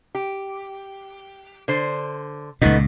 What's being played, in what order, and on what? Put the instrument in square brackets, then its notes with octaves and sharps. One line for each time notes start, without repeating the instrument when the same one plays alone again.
[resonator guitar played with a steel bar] G4
D3 C5
[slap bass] C#2 A#2 [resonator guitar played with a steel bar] A3 B3 D#4